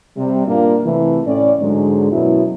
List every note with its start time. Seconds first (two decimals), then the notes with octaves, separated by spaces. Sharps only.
0.17 C3 G3
0.46 G2 A#2 A#3 D4 F4
0.85 C3 E3 A3
1.26 A2 C#4 D5
1.60 G#2 D3 F#3 G#3
2.12 F#2 B2 F#3 E4